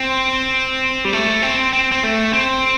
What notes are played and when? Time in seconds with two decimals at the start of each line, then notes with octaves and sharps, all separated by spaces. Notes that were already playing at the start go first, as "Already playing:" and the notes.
Already playing: C4
1.05 G3
1.13 A3
1.42 C4
1.73 C4
1.92 C4
2.03 A3
2.33 C4